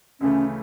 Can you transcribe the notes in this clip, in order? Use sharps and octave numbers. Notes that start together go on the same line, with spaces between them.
D2 C#3 E3 A3 C#4